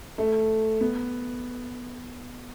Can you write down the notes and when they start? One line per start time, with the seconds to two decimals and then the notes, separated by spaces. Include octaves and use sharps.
0.18 A3
0.81 B3